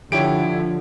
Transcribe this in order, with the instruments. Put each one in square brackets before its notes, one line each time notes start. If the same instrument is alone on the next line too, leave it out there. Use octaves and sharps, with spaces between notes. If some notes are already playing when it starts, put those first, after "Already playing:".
[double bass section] D3 [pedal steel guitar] F3 [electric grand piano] E4 D7 [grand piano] G4 C#5